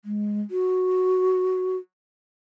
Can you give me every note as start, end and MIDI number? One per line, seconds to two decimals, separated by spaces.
0.05 0.41 56
0.51 1.76 66